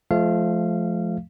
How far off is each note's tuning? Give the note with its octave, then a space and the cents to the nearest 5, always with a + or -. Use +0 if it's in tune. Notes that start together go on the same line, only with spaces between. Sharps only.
F3 +0 A3 -35 F5 -20